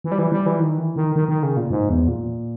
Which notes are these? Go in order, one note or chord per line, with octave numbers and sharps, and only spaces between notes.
E3
G3
E3
G3
E3
D#3
E3
D#3
D#3
D#3
C#3
A#2
G#2
E2
A#2